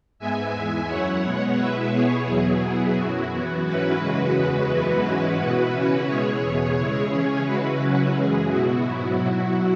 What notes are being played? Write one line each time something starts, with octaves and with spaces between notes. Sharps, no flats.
G#2 G#3 B3 E5 G#5
E2 E3 G#3
F#2 F#3 E4 C#5 F#5
B2 G#3 B3 C#5 F#5
B2 G#3 E4 B4 E5
B2 B3 E4 G#4 C#5
E2 B2 F#3 B3 E4 G#4
B2 F#3 B3 E4
F#2 F#3 E4 F#4
F#2 E3 B3
G#2 E3 C#4 E4 F#4 B4
F#2 C#3 E3 G#3
E2 C#3 G#3
F#2 E3 G#3 B3 E4 F#4 B4
G#2 E3 G#3 C#4 E4
B2 B3 E4
C#3 E3 C#4 E4
B2 G#3 E4 G#4 C#5
E2 B2 B3
C#3 G#3 E4
C#3 E3 C#4
C#3 G#3 E4 F#4 B4
C#3 F#3 C#4 E4
F#2 C#3 E3 G#3 G#4
B2 B3 E4 F#4
G#2 F#3 B3 E4 F#4
B2 F#3 E4